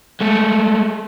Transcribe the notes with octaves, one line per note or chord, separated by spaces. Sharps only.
G#3 A3